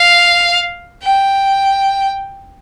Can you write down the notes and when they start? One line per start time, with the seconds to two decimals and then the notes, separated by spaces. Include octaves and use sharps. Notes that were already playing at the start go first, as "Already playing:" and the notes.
Already playing: F5
1.03 G5